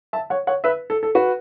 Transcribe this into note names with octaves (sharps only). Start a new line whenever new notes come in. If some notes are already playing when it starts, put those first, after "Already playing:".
E5 A5
C#5 F#5
C#5 F#5
B4 E5
A4
A4
F#4 B4